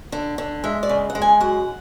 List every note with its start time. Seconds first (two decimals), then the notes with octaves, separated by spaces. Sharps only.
0.12 D3
0.38 D3
0.64 G#3 E5
0.83 D5
0.89 C#3
1.10 F#5
1.15 G#3
1.22 G#5
1.41 F#2 F#5